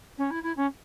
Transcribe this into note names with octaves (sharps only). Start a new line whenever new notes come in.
C#4
E4
E4
C#4